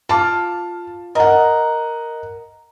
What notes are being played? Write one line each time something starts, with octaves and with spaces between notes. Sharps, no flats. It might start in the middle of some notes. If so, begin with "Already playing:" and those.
F4 F5 A5 D6
A#4 D#5 F#5